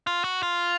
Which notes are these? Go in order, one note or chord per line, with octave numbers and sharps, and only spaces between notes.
F4
F#4
F4